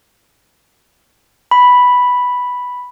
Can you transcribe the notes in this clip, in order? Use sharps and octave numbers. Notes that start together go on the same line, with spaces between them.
B5